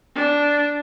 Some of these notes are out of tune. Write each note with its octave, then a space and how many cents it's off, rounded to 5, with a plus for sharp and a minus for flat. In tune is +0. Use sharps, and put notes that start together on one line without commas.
D4 -5